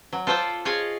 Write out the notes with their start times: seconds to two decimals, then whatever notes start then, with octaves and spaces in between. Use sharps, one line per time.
0.13 F#3
0.27 F4 A4 C5 D5 G5
0.65 F4 G#4 C#5 D#5 G#5